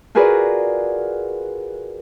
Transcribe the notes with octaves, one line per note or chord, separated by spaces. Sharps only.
F4 F#4 G#4 A#4 B4 D5